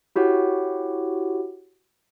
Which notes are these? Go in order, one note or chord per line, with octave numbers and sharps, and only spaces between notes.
E4 F#4 G4 C#5 F#5